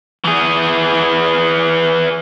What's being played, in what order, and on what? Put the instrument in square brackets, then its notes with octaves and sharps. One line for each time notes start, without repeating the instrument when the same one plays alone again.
[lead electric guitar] E3 G#4